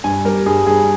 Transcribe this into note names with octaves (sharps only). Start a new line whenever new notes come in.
G2 G#5
G3 A#4
G2 G#4
G2 G#4